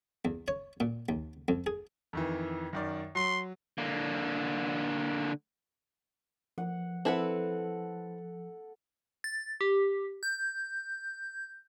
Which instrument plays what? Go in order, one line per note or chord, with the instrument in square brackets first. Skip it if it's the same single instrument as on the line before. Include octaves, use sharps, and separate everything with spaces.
[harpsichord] E2
C#5
A#2
D#2
F2
G#4
[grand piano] F2 D#3 E3
F#2 D#3 D5
[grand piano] F#3 [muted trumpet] C6
[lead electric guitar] D3 A#3
[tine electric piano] F3 [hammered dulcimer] F#5
[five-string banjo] C4 E4 B4 [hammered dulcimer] A4 F#5
[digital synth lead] A6
G4
G6